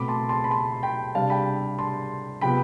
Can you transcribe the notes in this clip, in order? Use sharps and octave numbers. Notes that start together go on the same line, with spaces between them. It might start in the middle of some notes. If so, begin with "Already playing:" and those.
Already playing: B2 A3 C4 B5 D6
A5 C6
A5 C6
B5
A5 C6
G5 B5
C3 G3 D4 F5 A5
G5 B5
A5 C6
C3 F3 B3 G5 B5